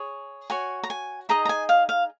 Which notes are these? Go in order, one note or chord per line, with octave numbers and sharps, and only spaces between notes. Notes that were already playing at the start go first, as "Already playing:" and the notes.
Already playing: G#4 C#5
F#4 C#5 G#5
A#5
G#5
D#4 G#4 D#5 A#5
A#5
G#5
F5
F5